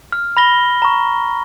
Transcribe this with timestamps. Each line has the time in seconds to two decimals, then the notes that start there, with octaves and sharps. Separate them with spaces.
0.12 F6
0.37 B5 A#6 G7
0.82 A#5 C#6